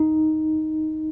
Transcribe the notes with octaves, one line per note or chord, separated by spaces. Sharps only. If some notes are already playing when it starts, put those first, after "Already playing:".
Already playing: D#4